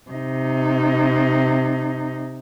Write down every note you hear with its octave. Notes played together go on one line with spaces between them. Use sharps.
C3 D#4